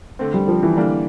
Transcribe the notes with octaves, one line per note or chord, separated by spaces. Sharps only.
D3 A3 C4
G3
F3
E3
D3 G3 A#3 D4